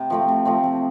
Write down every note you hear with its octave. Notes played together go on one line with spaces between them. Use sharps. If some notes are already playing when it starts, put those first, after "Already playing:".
Already playing: C3
F3 A3 C4
C3
F3 A3 C4
C3